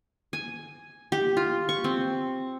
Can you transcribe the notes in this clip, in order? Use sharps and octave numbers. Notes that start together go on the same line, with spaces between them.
G#5
G4
F4
C#6
C4